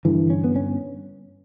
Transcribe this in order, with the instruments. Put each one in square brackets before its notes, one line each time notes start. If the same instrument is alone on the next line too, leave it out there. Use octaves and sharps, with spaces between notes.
[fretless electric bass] G2 D3 E3
C#4
B3
C#4